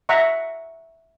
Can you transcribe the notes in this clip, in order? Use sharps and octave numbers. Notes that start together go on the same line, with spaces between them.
E5 F#5 A#5 C#6